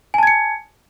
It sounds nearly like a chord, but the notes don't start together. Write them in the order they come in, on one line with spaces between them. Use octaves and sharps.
G#5 A5 G#6 C#7